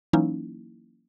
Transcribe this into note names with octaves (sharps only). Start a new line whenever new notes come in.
E3 F#3 A#3 C#4 D#4 E4